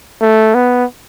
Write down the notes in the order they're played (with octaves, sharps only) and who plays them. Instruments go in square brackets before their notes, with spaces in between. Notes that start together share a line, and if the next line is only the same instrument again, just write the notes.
[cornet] A3
B3